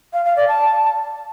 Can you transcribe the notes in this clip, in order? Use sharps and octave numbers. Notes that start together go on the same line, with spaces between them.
F5
F5
D5
A5